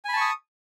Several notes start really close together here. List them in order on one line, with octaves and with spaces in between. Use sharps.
G#5 B5 A5 C#6 D#6